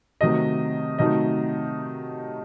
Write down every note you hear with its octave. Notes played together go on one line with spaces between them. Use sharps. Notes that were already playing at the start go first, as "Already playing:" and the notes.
C3 D#3 F#3 A3 D#5
C3 D#3 F#3 A3 D#4 D#5